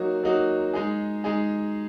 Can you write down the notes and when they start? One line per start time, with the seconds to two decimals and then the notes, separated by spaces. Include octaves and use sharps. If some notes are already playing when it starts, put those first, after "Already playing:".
Already playing: F#3 A#3 D#4 F#4
0.23 F#3 A#3 D#4 F#4
0.73 G#3 D#4 G#4
1.24 G#3 D#4 G#4